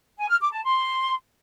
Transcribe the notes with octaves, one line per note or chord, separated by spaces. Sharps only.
G#5
F6
D6
A5
C6